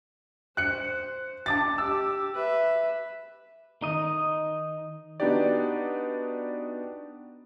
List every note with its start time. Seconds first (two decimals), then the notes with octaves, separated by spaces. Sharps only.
0.57 C5 F#6 C#7
1.46 D4 A5 D6 A6
1.78 G4 D6 E6
2.35 B4 E5
3.82 D#3 D#4 D#5
5.20 B3 D4 D#4 F#4 G4 D5